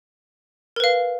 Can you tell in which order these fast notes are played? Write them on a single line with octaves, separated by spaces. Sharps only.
A#4 B4 F5